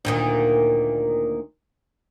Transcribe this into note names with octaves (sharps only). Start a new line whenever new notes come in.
D2 A#2 D#3